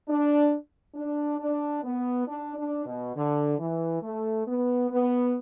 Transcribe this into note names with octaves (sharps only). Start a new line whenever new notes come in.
D4
D4
D4
B3
D4
D4
B2
D3
E3
A3
B3
B3